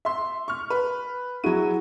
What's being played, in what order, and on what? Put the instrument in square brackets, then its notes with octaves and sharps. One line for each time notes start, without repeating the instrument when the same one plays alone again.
[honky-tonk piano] E5 C6
C#6 F6
B4
[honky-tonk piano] F#3 D#7 [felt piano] E4 F#4 G#4